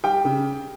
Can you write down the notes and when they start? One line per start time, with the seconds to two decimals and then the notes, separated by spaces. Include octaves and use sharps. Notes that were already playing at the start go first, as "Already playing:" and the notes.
0.03 G3 G4 G5
0.24 C#3